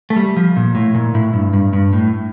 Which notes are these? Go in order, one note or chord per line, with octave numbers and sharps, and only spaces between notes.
A3
G3
F3
A#2
A2
A#2
A2
G2
G2
G2
A2